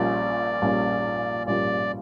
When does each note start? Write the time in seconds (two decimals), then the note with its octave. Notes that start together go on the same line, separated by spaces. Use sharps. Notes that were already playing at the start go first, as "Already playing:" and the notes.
Already playing: A#1 A#2 G3 C#4 F4 D5
0.62 A#1 A#2 G3 C#4 F4
1.47 A#1 A#2 G3 C#4 F4 D5